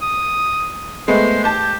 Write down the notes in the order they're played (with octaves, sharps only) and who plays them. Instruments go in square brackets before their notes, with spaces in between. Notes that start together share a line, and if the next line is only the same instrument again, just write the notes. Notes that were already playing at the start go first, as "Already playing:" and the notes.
[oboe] D#6
[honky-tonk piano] G#3 A3 B3 [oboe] C5
[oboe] G4 [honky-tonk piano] A5 G6